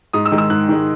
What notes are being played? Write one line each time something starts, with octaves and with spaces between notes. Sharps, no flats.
G#2 D#6
E6
D#3 G#3
E6
G#2 F#6
D#3 G#3